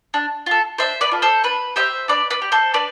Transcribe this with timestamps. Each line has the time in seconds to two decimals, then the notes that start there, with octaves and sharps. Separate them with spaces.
0.14 D4
0.46 F4 A4
0.78 D4 C5 E5
1.01 B4 D5
1.12 F4 A4
1.22 A4 C5
1.44 D4 B4
1.76 G4 C5 E5
2.08 D4 B4 D5
2.30 B4 D5
2.42 G4
2.52 A4 C5
2.74 D4 B4 D5